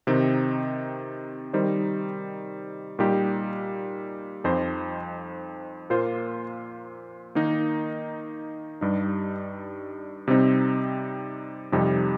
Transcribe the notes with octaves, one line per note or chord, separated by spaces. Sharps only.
C3 D#3 C4 D#4
D#3 G3 D#4 C5
A#2 G3 D#4 G4
F2 F3 D#4 C5
A#2 A#3 F4 C5
D#3 A#3 D#4
G2 G3 D#4
C3 G3 C4 D#4
F2 C3 G3 D#4